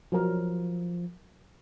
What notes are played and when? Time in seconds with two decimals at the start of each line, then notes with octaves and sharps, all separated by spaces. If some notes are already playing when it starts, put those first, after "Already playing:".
0.12 F3 F#3 A#4